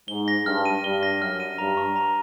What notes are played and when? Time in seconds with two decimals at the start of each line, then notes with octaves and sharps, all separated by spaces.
0.08 G#2 G7
0.28 A#6
0.46 G2 F6
0.65 D#7
0.84 G2 G7
1.03 A#6
1.21 F#2 F6
1.40 D#7
1.58 G2 A#5
1.77 C#6
1.96 A#5